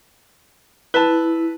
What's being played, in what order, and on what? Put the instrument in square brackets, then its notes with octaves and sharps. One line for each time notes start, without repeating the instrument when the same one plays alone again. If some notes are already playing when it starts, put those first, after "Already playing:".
[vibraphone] E4 [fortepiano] B4 A5